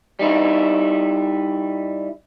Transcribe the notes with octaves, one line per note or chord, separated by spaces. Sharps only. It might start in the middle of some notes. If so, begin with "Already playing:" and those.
G3 D#4 E4